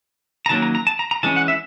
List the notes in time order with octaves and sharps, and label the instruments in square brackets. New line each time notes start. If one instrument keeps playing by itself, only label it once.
[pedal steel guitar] A#5
D#3 F#3 A#3 C#4 A5
A#5
A#5
A5
A#5
A#5
E3 G#3 C#4 A5
F#5
E5